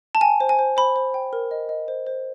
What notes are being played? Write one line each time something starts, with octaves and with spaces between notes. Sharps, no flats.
A5
G5 G#5
C5
G#5
C5
C5 B5
C5
G5
A#4
D#5
D#5
C5
C5